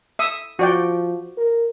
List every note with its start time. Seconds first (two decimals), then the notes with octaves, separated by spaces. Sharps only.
0.19 E5 D#6
0.59 F3 F#4 D5 G5
1.37 A#4